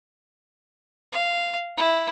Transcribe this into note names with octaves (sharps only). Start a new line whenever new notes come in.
F5
E4